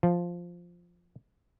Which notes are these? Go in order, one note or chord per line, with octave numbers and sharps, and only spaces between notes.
F3